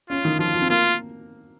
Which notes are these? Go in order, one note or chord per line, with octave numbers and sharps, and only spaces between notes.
C#4 F4
D#3
F3 F4
F3
C4
A#3 F4